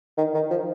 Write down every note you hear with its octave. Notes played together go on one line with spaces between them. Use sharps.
D#3
D#3
F3